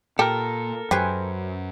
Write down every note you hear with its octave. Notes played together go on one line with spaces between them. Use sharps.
A#2 G4 A4 A#4
F#2 G4 B4 C5 G#5